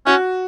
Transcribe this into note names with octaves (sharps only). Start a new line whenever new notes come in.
C#4 F#4